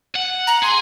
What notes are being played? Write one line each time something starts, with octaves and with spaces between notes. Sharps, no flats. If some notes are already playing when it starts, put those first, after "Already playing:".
F#5
A#5
G#4 C6